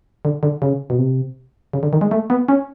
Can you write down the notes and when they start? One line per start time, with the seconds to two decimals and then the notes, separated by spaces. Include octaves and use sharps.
0.25 D3
0.43 D3
0.62 C#3
0.90 B2
0.99 C3
1.73 C#3
1.83 D3
1.93 D#3
2.01 G#3
2.11 A3
2.30 B3
2.49 C#4